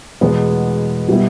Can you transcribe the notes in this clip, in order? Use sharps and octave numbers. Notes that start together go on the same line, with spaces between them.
E2 B2 G#3 B3
B2 G3 B3 E4